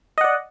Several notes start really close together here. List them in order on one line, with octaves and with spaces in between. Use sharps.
D#5 F#5 D5